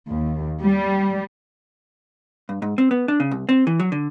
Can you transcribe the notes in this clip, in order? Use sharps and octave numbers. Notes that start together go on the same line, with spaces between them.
D#2
G3
G2
G#2
C4
B3
D4
C#3
C2
C4
E3
F#3
D3